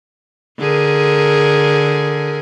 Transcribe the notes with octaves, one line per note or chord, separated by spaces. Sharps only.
D3 G#4 A#4